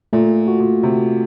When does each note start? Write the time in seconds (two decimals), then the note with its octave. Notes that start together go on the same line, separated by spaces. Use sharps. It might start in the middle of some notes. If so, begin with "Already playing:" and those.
0.13 A#2 A3
0.48 F#4
0.60 A#2
0.83 C3 F#4